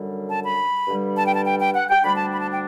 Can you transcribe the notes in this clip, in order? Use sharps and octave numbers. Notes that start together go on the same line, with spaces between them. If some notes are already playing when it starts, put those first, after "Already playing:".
Already playing: F#2 D3 G3
A5
B5
G2 D3 G3
A5
G5
A5
G5
G5
F#5
G5
D2 D3 G3 D4 B5
A5
B5
A5
G5